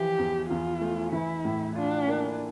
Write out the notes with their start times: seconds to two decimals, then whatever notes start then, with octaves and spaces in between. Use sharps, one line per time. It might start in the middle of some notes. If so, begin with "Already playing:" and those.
Already playing: E3 F3 G4
0.19 E2
0.50 E2 F4
0.81 A3
1.12 E3 E4
1.44 A2
1.75 D4 F4
2.07 A#3